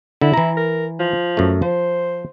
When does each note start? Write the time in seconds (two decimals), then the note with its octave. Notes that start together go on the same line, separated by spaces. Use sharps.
0.21 D3 E4
0.34 E3 A#5
0.57 A#4
0.99 F3
1.37 F#2 A3
1.62 F3 C5